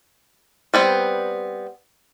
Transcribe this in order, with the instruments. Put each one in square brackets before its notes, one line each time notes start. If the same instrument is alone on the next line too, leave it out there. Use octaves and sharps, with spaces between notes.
[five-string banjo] G3 B3 C4